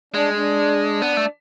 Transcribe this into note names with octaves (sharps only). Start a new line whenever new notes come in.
G#3 D4
D4
B3
A3